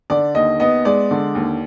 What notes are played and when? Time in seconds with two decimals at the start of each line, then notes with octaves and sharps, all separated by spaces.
0.10 D3 D5
0.35 D#2 D#5
0.60 B3 D#5
0.85 G#3 D5
1.11 D3
1.35 D#2